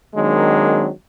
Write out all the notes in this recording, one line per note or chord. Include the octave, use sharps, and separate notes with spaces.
D#3 F#3 G#3 A#3 C4 D4